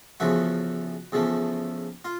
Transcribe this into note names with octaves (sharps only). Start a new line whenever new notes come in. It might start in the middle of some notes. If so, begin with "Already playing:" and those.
E2 C#3 F3 A3 F#4
E2 C#3 F3 A3
F4